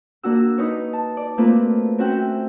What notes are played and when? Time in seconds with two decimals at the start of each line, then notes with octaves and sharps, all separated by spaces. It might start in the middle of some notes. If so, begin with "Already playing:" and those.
0.23 A#3 D4 F#4 E6
0.58 D#4 B4 C#5
0.93 A5
1.17 D5
1.38 A3 A#3 C4 F4 B4
1.98 C4 C#4 F#4 E5 F#5 G5